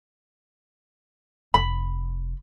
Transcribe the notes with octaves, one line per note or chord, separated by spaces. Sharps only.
F1 B5